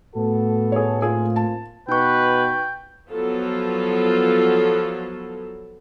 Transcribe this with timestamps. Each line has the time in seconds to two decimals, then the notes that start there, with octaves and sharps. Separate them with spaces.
0.15 A2 B3 F#4 A4
0.72 G#4 C#5
1.02 A2 A#3 C4 F4 G#4
1.36 A5
1.89 B2 D#4 B4 G5 C#6
3.11 F3 F#3 B3 F4 A4